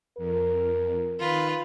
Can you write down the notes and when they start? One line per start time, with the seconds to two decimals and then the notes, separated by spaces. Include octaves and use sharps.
0.18 F2 A#4
1.20 D#3 F4 B4